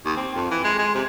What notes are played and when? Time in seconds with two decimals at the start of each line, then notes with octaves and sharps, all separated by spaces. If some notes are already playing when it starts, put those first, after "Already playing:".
0.05 D#2
0.16 C4
0.35 F2
0.51 E3
0.64 G#3
0.78 G#3
0.95 C3